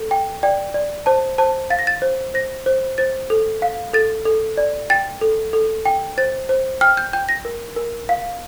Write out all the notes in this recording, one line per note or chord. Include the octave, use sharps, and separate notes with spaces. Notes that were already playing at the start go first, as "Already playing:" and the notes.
Already playing: A4
G5
D5 G5
D5
C5 A5
C5 A5
F5 A6
A#6
A6
C5
C5 A#6
C5
C5 A6
A4
F5
A4 A6
A4
D5
G5 A6
A4
A4
G5
C5 A6
C5
G5 F6
G6
G5 G6
A#6
A#4
A#4
F5